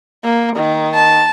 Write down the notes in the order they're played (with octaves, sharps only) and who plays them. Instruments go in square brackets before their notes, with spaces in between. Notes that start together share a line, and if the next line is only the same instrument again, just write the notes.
[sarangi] A#3
D#3
[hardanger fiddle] A5